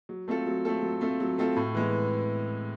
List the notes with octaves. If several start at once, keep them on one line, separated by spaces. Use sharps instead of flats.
F#3
A3 C4 F4 A4
F#3
A3 C4 F4 A4
F#3
A3 C4 F4 A4
F#3
A3 C4 F4 A4
A2
E3 G#3 B3